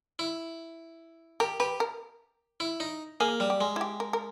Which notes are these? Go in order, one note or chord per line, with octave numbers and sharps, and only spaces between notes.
E4
G4 A#4
G4 B4
A#4
E4
D#4
A#3 G#4
G3
G4
G#3
E4
G4
A#4
A#4